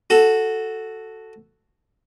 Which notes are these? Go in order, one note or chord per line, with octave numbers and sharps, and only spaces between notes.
F#4 A4